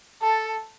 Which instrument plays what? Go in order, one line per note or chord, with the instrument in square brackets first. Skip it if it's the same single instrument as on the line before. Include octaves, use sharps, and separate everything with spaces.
[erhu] A4 [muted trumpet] A5